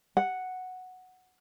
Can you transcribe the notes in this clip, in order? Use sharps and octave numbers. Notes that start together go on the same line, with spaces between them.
F#5